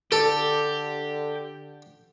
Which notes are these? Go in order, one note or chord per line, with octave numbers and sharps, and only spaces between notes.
D3 G4 A4